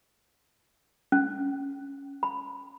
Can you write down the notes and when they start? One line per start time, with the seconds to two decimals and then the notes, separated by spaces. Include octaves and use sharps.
1.12 C#4
2.23 B5